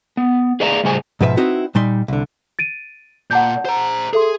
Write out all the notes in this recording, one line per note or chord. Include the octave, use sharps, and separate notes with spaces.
B3
G#4 B4 D5 E5 F5 A#5
A2 C#3 G3 G#4 C5 G#5
G#2 B2 F3 B4 D5 E5
C4 D#4 E4 F#4 B4
A#2 G3 D#4 C6
C2 D3
A6 D7 D#7
A#2 F#5 A5 G6
C5 A#5
G#4 A4 E5 C6